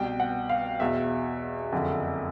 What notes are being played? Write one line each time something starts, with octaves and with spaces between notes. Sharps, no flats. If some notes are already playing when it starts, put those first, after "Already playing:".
Already playing: C2 B2 G5
F#5
F5
E2 B2 E5
F#1 F2 D3